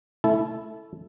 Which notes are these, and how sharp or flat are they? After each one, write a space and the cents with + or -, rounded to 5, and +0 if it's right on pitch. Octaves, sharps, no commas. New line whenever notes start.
A3 +0 E4 +0 A5 -20